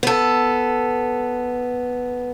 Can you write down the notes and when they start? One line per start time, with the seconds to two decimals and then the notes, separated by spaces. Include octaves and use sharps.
0.03 B3 A4